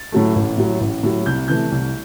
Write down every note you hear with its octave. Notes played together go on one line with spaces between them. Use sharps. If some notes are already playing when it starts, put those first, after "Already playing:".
Already playing: A6
A2 F#3 A3
A1
A2 F#3
A1
A2 F#3
C2 G6
C3 E3 A3 G6
C2